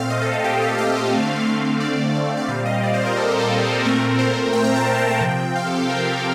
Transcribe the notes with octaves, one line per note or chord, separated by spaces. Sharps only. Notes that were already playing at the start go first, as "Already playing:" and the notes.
Already playing: A#2 A3 C4 F5
D#5
A4
A4
G4
G4
F5
D3 A3 C4
F5
F5
D5
D5
D5
A#2 G3 C4 F5
D#5
D5
C5
A#4
A4
G4
A4
A#2 A3 C4 A#4
C5
G5
A#5
A5
A5
A5
G5
C3 F3 C4
F5
A4
G4
A#4